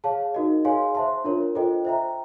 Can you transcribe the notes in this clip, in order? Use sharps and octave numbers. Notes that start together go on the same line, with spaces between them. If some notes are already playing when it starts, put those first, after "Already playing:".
G#4 C#5 F5 A5
D#4 F#4 A#4 D#5
G#4 C#5 F5 G#5 C6
C5 E5 A5 C6
D4 F4 A#4 C#5
F4 A4 C5 D#5 G5
C5 E5 G5 A#5